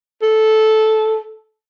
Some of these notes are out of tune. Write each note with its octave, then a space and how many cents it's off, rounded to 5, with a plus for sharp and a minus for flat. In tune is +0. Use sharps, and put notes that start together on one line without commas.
A4 -10